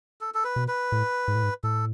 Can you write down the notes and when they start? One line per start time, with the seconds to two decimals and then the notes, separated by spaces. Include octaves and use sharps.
0.21 A4
0.34 A4
0.44 B4
0.56 B2
0.68 B4
0.92 A2
1.28 G#2
1.35 A2
1.43 G#2
1.63 A2 A4